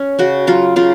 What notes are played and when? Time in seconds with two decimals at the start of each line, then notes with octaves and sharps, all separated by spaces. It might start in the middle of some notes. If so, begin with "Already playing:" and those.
Already playing: C#4
0.19 C#3 F#4
0.47 F#3 F4
0.76 C#3 F4